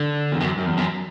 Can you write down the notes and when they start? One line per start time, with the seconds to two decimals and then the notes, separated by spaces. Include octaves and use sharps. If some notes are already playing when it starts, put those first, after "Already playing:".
Already playing: D3
0.32 E2
0.40 F#2
0.58 F#2
0.66 E2
0.77 F#2